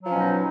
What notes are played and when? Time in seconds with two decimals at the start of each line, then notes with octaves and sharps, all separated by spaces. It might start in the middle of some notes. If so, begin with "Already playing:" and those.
0.01 F#3
0.05 F3
0.09 C#4
0.13 B2
0.17 D#4